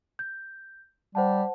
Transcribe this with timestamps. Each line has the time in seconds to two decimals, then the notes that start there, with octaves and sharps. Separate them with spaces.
0.19 G6
1.15 G3 C5 F#5 A5